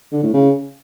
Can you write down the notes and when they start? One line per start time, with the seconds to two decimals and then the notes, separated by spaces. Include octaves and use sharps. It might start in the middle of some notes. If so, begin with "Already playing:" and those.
0.12 D3
0.23 A2
0.33 C#3